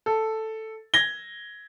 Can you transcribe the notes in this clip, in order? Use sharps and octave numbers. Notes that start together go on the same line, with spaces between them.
A4
G#6 A#6 G7